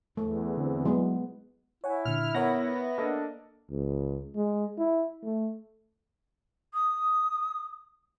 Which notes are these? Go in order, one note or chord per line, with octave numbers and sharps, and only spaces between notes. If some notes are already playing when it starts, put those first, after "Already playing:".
E2 A3
D3 C4
F#3 G#3 B3 E4
E4 C#5 F#5 G#5
A#2 D3 F6
B3 A#4 C#5 E5 F#5 A#6
A#3 D4 A4 D#5
C#2
G#3
E4
A3
D#6